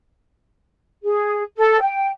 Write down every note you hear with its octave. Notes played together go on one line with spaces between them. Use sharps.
G#4
A4
G5